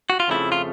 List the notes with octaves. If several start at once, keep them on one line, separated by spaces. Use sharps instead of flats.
F#4
F4
F2 C#3 F3 A3 E4
F4